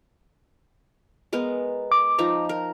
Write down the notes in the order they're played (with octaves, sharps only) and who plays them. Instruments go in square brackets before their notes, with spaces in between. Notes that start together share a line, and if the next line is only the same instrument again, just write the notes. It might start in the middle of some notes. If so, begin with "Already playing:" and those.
[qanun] G#3 B3 A#4
[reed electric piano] D6
[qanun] F3 D#4 A#5
A#4